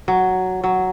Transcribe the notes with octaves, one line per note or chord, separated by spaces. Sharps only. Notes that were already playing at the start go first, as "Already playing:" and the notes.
F#3
F#3